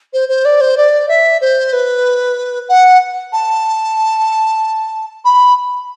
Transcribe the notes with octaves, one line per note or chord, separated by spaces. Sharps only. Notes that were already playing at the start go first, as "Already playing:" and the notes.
C5
C5
D5
C5
D5
E5
C5
B4
F#5
A5
B5